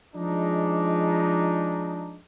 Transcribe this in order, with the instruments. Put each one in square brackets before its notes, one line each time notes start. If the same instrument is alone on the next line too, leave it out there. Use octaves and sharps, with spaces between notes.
[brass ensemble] F3 G#3 D4 D#4